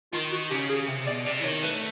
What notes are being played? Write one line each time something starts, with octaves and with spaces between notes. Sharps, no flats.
D#3 F4
F#4
C#3 G4
G#4
C3
B2 D5
C3 D5
E3
D#3 C#5
A3 B4